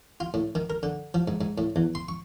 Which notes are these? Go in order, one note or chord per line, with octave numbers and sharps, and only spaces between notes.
F4
A2
D#3
A#4
D3
F3
G#2
G#2
A2
E2
C6
C#6